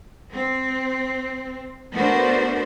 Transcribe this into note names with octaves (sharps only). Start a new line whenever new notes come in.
C4
A3 B3 D4 F#4 A#4 C5